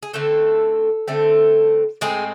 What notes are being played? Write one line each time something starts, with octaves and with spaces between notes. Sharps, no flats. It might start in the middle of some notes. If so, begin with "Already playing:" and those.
G#4
D3 A3 C4 A4
D3 A3 C4
A2 G#3 C4 G#4